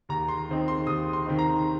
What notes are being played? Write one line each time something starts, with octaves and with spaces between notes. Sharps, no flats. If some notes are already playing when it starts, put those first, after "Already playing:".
D#2 A#5
C6
D#3 C4 D#4
C6
D#2 D#6
C6
D#3 C4 D#4
A#5